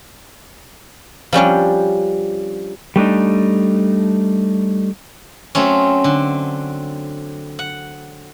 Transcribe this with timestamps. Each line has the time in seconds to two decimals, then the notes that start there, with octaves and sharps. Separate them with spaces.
1.33 F3 G3 C#4 D4
2.96 G3 A3 D4 D#4
5.55 F#3 A3 C4 C#4
6.04 D3
7.59 F#5